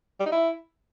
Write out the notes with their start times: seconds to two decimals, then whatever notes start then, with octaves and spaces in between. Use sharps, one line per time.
0.20 G3
0.26 D#4
0.32 E4